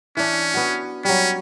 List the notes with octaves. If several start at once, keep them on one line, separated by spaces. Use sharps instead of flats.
E3 C#4 D4
B3 F#4
F#3 G3 C#4